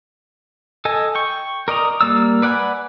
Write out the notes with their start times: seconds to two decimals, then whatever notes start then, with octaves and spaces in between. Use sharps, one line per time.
0.85 A4 D#5 G#5
1.15 G5 C#6
1.68 A#4 D5 D#5 A#5
2.01 G3 A#3 D5 E6
2.42 B4 D5 F#5 G#5 B5